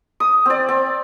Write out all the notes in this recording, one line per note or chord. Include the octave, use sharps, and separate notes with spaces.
D#6
C4 D5
C4